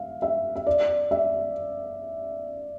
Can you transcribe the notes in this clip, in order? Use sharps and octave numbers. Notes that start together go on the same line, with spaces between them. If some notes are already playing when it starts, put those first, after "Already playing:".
Already playing: E5 F5
E5
E5
D5
E5